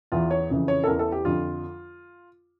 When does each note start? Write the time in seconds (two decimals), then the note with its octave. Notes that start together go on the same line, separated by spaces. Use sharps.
0.12 E2 E3 F4
0.31 C#5
0.50 F2 C#3 E3
0.68 C#5
0.84 A4
0.87 E2 E3 A#4
0.99 A4
1.12 G4
1.25 F2 D3 F3 F4